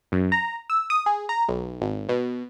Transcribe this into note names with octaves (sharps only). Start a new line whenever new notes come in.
F#2
A#5
E6
D#6
G#4
A#5
B1
G#1
B2